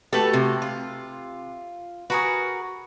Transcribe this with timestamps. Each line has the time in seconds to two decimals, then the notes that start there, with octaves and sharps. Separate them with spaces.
0.13 A3 F#4 G4 A4 B4
0.33 C3
0.62 F4
2.10 F#4 G#4 A#4 B4